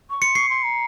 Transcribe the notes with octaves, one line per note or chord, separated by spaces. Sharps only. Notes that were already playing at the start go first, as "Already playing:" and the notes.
C#6
C6 C#7
C#6 C7
C6
A#5